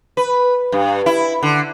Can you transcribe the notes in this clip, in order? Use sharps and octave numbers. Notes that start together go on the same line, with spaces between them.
B4
G2
E4
D3